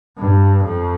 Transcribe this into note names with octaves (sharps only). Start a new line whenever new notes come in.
G2
F2